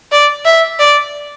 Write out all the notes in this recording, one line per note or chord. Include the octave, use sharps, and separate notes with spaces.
D5
E5
D5